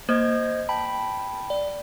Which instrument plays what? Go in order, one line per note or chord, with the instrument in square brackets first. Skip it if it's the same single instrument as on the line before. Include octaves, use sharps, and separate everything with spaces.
[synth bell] A#3 [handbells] C5 D#5 G#6
[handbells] G5 B5 [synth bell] A5
[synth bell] D5